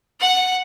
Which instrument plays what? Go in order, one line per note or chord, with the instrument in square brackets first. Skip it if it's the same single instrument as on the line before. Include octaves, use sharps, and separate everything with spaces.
[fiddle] F#5